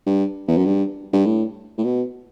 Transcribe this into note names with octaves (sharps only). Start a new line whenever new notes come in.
G2
E2
F#2
G2
G2
A2
A2
B2